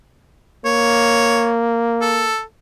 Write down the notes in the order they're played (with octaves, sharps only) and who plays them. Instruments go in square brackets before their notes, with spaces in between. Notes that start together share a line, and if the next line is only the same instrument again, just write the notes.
[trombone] A#3 [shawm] C#5
[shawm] A4